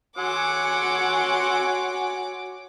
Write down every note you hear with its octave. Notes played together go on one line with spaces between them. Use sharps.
F#4 C#5 F#5 G#5 C6 D6 E6